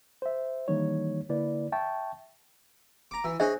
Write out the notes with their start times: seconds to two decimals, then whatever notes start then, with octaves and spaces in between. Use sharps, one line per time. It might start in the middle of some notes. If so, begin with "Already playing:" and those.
0.22 C5 E5
0.68 D#3 E3 G3 A#3 D#4 C#5
1.29 D3 A#3 E4 B4 D5
1.72 E5 G5 A5 C#6
3.11 A#5 D6
3.24 E3
3.40 D4 G#4 C5 C#5 D#5 E5